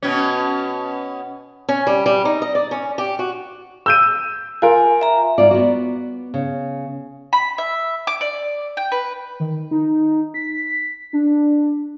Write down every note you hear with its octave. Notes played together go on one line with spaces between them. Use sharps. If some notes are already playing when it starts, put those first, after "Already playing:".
B2 C#4
C#4
G3
G3
D#4
D#5
D5
C#4
G4
F#4
E6 G6 D#7
F4 A#4 G#5
E5 A#5
G#2 F4 D5
B3 F#4
C#3
B5
E5
D6
D5
G5
B4
D#3
D#4
B6
D4